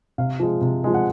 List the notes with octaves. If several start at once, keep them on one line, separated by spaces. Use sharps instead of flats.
C3 F5
F3 G#3
C3
F3 G#3
F#5